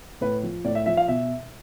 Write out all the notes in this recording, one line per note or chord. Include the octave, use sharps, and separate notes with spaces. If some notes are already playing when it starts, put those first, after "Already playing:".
A2 B4
F3
A2 D5
E5
F3 E5
F5
B2 E5